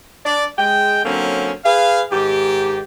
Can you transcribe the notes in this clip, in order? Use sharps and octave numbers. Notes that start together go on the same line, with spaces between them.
D4 D5
G#3 G5
D3 F#3 A#3 C4 C#4
G#4 B4 F5
G#2 D#3 G4